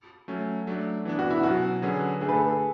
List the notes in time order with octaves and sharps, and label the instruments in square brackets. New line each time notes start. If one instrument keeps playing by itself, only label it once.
[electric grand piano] F#3 A3 C#4
F#3 A3 D4
E3 B3 D4
[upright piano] F#4
E4
[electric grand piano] B2 F#3 C#4 [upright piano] F#4
[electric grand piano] D3 F#3 C#4 G#4 B4
[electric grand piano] D3 A3 D4 [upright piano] G#4
[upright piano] B4
A4
G#4